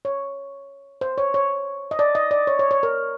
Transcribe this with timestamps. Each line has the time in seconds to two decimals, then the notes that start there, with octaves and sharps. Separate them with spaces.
0.05 C#5
1.01 C5
1.18 C#5
1.34 C#5
1.91 D#5
1.99 D5
2.15 D#5
2.31 D5
2.47 C#5
2.59 C#5
2.71 C#5
2.83 A#4